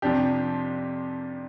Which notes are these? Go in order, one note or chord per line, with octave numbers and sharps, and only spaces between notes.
F2 C3 F3 D4 G4